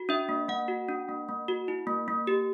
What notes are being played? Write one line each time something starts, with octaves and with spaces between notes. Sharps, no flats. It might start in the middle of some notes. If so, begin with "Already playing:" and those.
Already playing: F#4
D4 E5
A#3
A#3 F#5
F#4
D4
A#3
A#3
F#4
E4
A#3
A#3
G4